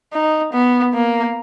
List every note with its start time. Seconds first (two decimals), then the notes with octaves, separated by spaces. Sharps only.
0.13 D#4
0.53 B3
0.94 A#3